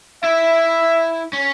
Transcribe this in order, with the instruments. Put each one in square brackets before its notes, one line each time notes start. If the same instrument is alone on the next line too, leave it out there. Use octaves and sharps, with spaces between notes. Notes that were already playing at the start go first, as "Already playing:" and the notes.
[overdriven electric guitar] E4 [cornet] E5
[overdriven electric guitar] C#4